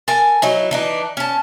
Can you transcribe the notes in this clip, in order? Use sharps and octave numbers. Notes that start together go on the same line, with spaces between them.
A4 A#4 G#5
F#3 D#4 E4
E3 D4 D#4
C#4 A5